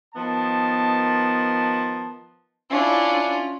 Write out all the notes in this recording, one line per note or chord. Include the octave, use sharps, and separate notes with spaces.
D#3 F3 B3 A5
C#4 D4 E4 F4